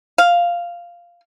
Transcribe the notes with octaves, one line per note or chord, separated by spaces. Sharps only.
F5